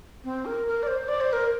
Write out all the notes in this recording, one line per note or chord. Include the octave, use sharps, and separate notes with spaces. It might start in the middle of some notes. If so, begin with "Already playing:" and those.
C4
A#4
A#4
D5
C5
D5
C5
A#4